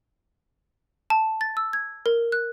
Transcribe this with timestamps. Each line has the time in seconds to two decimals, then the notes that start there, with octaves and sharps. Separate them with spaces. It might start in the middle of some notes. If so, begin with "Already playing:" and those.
1.10 A5
1.41 A6
1.57 E6
1.73 G#6
2.06 A#4
2.32 F#6